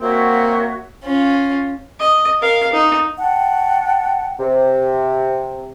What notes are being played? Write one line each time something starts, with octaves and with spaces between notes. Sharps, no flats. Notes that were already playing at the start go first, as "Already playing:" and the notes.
A#3 C4 F#4 C#5 E5
C#4 F4
D#5
A#4 F5
D#4
F#5 G5 A5
C3